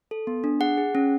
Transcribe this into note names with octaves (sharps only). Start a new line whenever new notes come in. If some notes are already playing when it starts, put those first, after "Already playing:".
A4
B3
D4
G#4 F#5
G#4
C#4